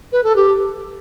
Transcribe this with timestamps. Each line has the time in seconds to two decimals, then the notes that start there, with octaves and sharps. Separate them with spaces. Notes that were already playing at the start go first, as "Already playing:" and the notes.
0.12 B4
0.24 A4
0.36 G4